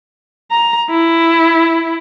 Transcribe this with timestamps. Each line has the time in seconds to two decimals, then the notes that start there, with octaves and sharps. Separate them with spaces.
0.51 A#5
0.90 E4